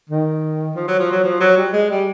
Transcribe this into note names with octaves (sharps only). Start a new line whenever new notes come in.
D#3
F3
F#3
F3
F#3
F3
F#3
G3
G#3
G3